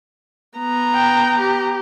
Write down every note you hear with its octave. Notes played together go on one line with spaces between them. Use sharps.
B3 A#5
G5
G4